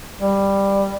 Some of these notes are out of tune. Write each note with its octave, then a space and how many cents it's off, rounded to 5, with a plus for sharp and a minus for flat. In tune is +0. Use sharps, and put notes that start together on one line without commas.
G3 +10